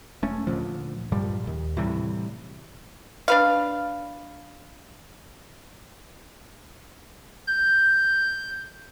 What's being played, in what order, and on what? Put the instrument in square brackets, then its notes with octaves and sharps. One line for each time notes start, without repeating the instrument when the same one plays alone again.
[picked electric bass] E1 A3 C#4
D2 A#2 F3
G2 A#2 F3 G3
D1 D#2
A2 C3 E3 G3
[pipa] D4 B4 F5
[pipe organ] G6